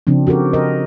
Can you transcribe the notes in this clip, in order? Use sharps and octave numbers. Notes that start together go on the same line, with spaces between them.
C#3 F3 C4 D4
F#4 G4 A4 A#4
A#4 C5 D#5